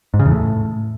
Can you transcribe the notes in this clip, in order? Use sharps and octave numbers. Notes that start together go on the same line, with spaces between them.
G#2
C#3
E2
A2